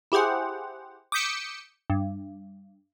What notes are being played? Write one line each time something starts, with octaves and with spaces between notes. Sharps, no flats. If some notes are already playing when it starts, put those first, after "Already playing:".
E4 G4 G#4 C5 F#5
D6 D#6 G6 B6 C#7 E7
G2